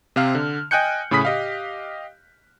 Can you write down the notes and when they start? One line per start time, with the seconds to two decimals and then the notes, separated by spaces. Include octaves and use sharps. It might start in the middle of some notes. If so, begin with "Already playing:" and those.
0.16 C3 C4 F5 F6
0.35 D3
0.71 D#5 G5 G#5 F#6 G6 C#7
1.11 A2 C#3 G#4 B5 D#6 B6
1.25 G4 D#5 F5